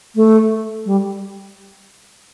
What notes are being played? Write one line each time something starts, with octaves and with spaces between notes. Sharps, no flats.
A3
G3